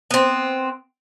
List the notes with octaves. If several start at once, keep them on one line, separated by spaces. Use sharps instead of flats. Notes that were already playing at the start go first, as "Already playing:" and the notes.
B3 C4